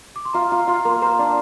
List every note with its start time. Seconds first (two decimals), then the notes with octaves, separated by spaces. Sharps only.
0.16 D6
0.25 C6
0.33 F4 A#5
0.50 F4 A#5
0.67 F4 C6
0.85 A#3 C6
1.02 C5 A#5
1.19 D4